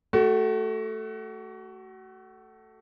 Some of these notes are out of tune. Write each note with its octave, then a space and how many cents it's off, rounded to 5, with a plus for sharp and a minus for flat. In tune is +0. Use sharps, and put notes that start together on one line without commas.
A3 +0 F#4 +30